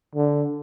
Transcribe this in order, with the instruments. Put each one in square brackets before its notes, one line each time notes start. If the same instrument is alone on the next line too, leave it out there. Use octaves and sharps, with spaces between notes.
[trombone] D3